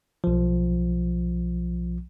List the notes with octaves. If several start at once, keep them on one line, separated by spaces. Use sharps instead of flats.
B1 F3